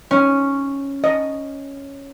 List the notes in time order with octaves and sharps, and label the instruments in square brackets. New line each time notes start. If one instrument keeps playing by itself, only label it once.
[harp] C#4
[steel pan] D#5